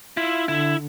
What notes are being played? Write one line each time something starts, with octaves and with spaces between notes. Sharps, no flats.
E4 F4
D3 E4